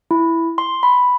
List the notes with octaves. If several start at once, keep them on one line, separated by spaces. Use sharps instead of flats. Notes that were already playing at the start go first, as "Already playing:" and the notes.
E4
C6
B5